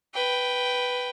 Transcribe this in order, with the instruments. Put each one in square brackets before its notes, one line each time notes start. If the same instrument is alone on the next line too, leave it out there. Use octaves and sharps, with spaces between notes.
[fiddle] B4 G5